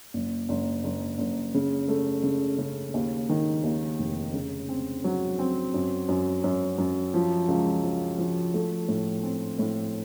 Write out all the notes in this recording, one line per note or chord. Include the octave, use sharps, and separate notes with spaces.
F#1
F#1
F#1
F#1
C#3
A3
C#3
C#3
D#2
D#3
D#2
F1
C#3
C4
F#3
C4
F#2
F#2
F#2
F#2
F3
C#2
F3
F3
A3
A2
C4
A2